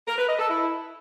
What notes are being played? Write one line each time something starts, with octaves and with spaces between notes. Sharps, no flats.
A#4
B4
D#5
A4
E4